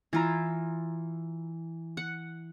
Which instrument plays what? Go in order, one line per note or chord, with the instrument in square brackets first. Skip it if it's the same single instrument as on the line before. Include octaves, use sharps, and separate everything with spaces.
[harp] E3 A#5 [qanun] E4 F4
[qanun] F#5